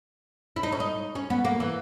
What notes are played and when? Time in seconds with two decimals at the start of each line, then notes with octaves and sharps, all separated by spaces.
0.56 E4
0.63 D#4
0.72 C#4
0.80 D#4
1.15 C#4
1.30 B3
1.45 A#3
1.60 E3